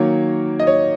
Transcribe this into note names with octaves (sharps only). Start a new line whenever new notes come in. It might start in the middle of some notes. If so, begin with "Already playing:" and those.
Already playing: D#3 F#3 A#3 C#5
D#5
C#5